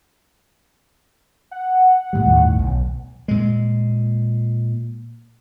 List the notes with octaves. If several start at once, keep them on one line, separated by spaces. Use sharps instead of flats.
F#5
A2 E3 G3
G1 D#2 A2
B1
A#2 G#3